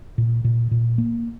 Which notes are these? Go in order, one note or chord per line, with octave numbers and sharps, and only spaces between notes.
A#2
A#2
A#2
A#3